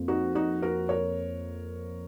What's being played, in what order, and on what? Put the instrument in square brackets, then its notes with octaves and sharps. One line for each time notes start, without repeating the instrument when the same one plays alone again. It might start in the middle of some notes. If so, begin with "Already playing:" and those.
Already playing: [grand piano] F2 A#3
[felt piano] D#4 F#4
D#4 F#4
F#4 A#4
A#4 C#5